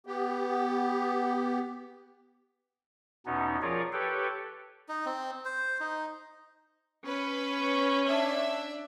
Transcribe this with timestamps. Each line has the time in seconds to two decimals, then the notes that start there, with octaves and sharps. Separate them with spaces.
0.07 B3 G4
3.26 E2 B2 B3 C#4 D#4
3.62 F3 F4 G#4 A#4 C#5 D5
3.93 G4 A4 B4 C#5 G5
4.89 D#4
5.06 C4
5.45 C5
5.80 D#4
7.06 C#4 B4
8.07 D4 E5